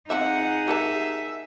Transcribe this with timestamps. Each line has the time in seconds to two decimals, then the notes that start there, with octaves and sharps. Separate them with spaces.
0.10 F3 C4 D#4 G#4 E5 F#5
0.68 G4 A#4 E5 A5